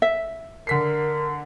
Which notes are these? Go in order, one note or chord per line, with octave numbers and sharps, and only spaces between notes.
E5
D3 A#4 B6 C7